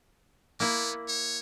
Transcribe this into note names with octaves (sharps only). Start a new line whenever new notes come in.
A#3 B3 E4
C#5